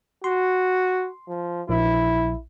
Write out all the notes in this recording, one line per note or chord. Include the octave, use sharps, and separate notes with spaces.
F#4 C6
F3
A#1 E4